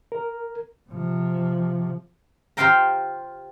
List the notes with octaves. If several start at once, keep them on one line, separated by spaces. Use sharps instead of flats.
A#4
C3 F3
F4 G4 C5 F5 G5 A#5